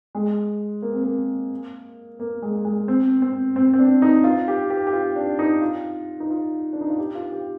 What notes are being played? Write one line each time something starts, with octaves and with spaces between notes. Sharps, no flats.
G#3
A#3
C4
A#3
A#3
G#3
G#3
C4
C4
C4
C4
D4
D#4
F4
G4
G4
G4
F4
D4
D#4
F4
D#4
F4
D4
D#4
F4
G4
F4
G4